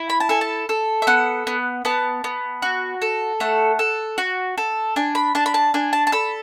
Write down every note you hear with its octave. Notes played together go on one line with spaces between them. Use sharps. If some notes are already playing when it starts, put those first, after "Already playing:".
Already playing: E4
B5
A5
A4 G#5
A5
A4
E5
B3 F#5
B3
B3 A5
B3
F#4
A4
A3 F#5
A4
F#4
A4
D4 G#5
B5
D4 A5
B5
A5
D4 G#5
A5
A5
A4 B5